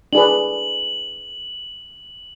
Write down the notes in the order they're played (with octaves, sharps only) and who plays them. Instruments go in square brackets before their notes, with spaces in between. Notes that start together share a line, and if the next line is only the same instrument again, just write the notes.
[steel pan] D4 G#4 B4 [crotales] F#7